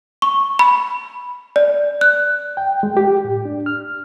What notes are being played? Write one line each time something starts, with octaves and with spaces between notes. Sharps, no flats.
C#6
B5
D5
F#6
G5
G#3
G4
A2
D4
F6